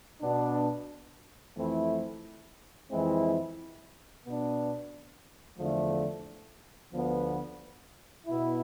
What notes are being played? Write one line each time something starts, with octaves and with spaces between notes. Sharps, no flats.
B2 B3 D4
F2 E3 A3 C4 E4
F2 E3 G#3 C4 E4
B2 B3 D4
E2 D3 F3 A3
D2 D3 F3 B3
B2 B3 E4